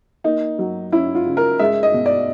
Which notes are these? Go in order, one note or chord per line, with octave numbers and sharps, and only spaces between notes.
A#3 D#4
F#3
C#4 E4
F4
C#3
A#4
G#3 E5
D#5
B2
D5